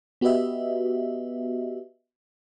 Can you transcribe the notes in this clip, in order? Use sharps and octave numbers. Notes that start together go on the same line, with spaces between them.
B3 F#4 G4 B4 D#5 E5